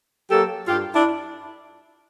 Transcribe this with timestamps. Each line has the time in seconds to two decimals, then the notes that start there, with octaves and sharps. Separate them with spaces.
0.29 F#3 A#3 G4 A4
0.68 G2 F4 G4
0.95 D4 E4